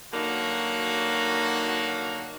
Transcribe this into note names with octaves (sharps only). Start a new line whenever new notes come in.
D3 F#3 A#3 D#4 F#4